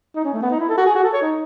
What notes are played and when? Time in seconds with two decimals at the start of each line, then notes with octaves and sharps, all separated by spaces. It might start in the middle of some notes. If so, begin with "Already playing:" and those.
0.15 D#4
0.25 C#4
0.33 A3
0.42 B3
0.51 D#4
0.59 E4
0.69 A4
0.77 F#4
0.86 G#4
0.95 F#4
1.04 A4
1.13 C#5
1.22 D#4